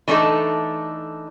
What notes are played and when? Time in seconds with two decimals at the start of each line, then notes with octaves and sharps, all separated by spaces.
0.08 E3 A3 D4 D#4 A4